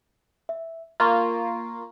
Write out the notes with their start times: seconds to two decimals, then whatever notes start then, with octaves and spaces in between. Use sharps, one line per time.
0.49 E5
1.00 A#3 F4 A#5 C6 C#6